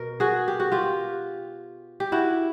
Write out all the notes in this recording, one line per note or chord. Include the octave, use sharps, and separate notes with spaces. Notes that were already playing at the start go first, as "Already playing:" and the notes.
Already playing: B2 A#4
F#4 G#4
G4
F#4
F4 G4
G4
E4 F#4